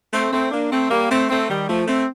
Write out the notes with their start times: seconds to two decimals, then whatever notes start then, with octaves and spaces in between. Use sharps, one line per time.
0.13 A3 C4
0.32 A3 C4
0.51 A#3 D4
0.71 A3 C4
0.90 G3 A#3
1.10 A3 C4
1.30 A3 C4
1.49 D#3 G3
1.69 F3 A3
1.87 A3 C4